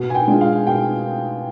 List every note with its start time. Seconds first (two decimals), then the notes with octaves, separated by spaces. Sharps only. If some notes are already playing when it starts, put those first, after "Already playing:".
Already playing: B2
0.10 G#5
0.15 G5
0.28 G#3 D4 F4
0.41 F5
0.67 B2 G5